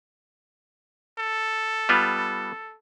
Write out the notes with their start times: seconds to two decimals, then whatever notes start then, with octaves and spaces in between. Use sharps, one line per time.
1.19 A4
1.89 G3 B3 F4